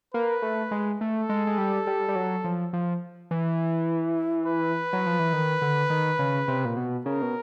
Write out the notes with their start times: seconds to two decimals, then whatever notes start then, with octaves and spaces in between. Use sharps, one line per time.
0.14 A#3 B4
0.42 A3
0.71 G#3
1.01 A3 A4
1.29 G#3
1.47 G#3
1.58 G3
1.87 G3
2.08 G3
2.15 F#3
2.44 F3
2.73 F3
3.31 E3
4.46 B4
4.93 F#3
5.06 F3
5.20 E3
5.33 D#3
5.62 D3
5.90 D#3
6.19 C#3
6.48 C3
6.65 A#2
6.77 B2
7.06 C#3 A#4
7.22 B2